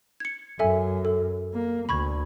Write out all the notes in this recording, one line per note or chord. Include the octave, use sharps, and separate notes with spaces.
G#6 C#7
F#2 A4 E5 G#5
A4
A#3
D2 B5 C#6 G#6